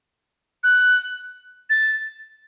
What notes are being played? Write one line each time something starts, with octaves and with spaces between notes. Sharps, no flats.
F#6
A6